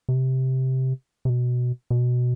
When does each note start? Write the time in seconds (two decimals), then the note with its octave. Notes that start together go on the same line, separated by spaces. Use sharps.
0.09 C3
1.25 C3
1.30 B2
1.90 B2